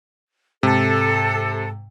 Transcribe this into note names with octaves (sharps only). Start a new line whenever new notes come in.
G#2 C3 A4